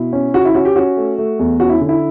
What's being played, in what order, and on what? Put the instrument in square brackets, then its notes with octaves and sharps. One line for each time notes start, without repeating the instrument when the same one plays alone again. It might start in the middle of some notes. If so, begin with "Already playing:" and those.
Already playing: [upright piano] B2 E4
C#4
C#3 F#4
E4
C#4 F#4
G4
C#4 F#4
A3
A3
E2
C#4 F#4
E4
D3
E4